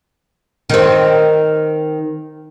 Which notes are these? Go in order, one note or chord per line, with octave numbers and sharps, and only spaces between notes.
D#3 C4